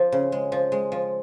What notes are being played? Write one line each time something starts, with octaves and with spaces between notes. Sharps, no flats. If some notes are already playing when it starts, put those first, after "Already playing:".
Already playing: F3
C#3
G#3
F3
G#3
F3